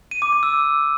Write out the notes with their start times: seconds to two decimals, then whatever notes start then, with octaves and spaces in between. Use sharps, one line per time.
0.11 D#7
0.22 D6
0.32 D6
0.43 E6